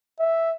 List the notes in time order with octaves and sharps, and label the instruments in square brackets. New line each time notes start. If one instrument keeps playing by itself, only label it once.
[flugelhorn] E5